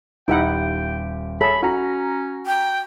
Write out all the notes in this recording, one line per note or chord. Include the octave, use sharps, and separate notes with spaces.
D#1 D#4 E4 G4 F#5 G5
G#4 A4 C#5 E5 B5
C#4 F#4 A#5
G5